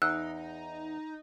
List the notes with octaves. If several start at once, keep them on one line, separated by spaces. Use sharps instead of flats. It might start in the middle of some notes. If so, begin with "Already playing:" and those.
E2 D#4 E6 F#6